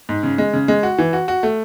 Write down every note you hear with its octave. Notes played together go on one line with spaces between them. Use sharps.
G#2
C#3
G#3
C#3
G#3
F#4
E3
F#4
F#4
A3